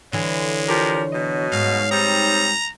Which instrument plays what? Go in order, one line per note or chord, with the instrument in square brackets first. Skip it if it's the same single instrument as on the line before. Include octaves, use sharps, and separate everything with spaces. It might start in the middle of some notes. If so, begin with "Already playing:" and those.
[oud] D3 E3 [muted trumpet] G#3 [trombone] C#5
[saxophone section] F3 G4 A#4
B2 F#3 D#5
[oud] G#2 [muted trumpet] F5
[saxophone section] G3 C4 D#4 [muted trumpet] A#5